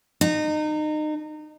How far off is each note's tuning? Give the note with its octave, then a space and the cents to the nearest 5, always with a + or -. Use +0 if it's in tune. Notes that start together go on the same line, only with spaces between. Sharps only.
D#4 -30